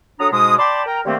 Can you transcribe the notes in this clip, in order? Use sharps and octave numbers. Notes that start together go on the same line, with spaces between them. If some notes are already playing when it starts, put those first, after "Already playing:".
F#3 D4 A4 A#5 D#6
G#2 B2 G#3 D#6
D5 G5 A5 B5 C6 D6
A#4 G5 A#5
D3 D#3 A3 A#3 C4 G4